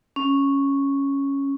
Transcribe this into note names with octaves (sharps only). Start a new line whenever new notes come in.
C#4